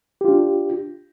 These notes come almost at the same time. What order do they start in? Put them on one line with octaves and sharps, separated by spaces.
G4 F4 D4